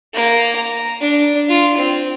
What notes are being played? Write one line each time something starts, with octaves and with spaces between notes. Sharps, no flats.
A#3
A#5
D4
F4
C4